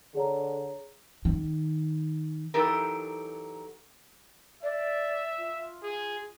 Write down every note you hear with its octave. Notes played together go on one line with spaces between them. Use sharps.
D3 G#4 C#5 A#5
D#3
E3 F#3 D#4 G4 A4 A#4
D5 E5
F4
G#4